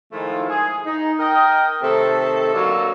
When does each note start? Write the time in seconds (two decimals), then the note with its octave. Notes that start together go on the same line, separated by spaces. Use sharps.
0.12 D#3 F3 G#3 A3 E4 F4
0.48 G#4
0.85 D#4
1.19 A#4 D#5 G5
1.82 C3 D#3 A3 A4
2.53 D3 F#3 A#3 A4 D#5 F5